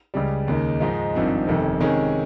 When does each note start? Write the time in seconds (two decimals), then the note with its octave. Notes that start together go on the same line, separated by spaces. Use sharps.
0.14 C#2 C#3 G3
0.48 D#2 C#3 G#3 D#4
0.80 G#2 F3 G#3 D#4
1.14 G#1 G2 F3 C4 D#4
1.47 G1 F2 C3 D#3
1.80 C3 D#3 G#3 C#4 G#4